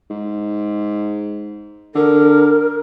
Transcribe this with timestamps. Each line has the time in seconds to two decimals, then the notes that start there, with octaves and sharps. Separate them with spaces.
0.10 G#2
1.95 D3 A#4